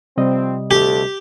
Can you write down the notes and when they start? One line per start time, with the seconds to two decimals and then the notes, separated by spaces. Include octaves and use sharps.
0.18 C3 F3 G3 C4 D#5
0.71 D2 G4 A4